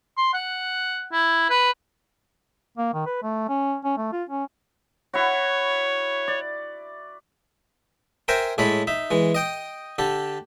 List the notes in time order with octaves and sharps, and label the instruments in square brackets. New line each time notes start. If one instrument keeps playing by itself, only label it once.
[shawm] C6
F#5
E4
B4
[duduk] A#3
D#3
B4
A3
C#4
C#4
A3
F4
C#4
[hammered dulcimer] E4 F#4 [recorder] C#5
[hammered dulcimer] D5
[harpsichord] A#4 C5 E5 G5 G#5 A#5
A2 G#3 A4 C#5 B5
D#4 E5
E3 G#3
D#5 G5 D#6
D3 G4 A4